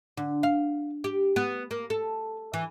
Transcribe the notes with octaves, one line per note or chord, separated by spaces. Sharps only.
D3
F5
G4
B3
A#3
A4
E3